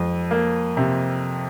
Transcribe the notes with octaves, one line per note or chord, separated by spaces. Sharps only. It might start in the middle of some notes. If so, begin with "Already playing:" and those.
Already playing: F2
A#3
C3